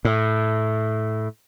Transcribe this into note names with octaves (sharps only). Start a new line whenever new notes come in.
A2